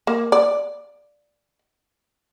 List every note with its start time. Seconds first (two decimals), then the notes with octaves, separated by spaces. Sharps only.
0.07 A#3
0.32 D5